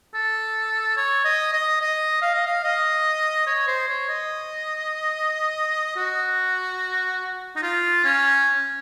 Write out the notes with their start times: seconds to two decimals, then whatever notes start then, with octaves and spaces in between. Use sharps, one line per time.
0.14 A4
0.97 C#5
1.25 D#5
1.53 D#5
1.81 D#5
2.22 F5
2.34 D#5
2.46 F5
2.64 D#5
3.47 C#5
3.67 C5
3.88 C#5
4.09 D#5
5.96 F#4
7.56 D#4
7.63 F4
8.05 C#4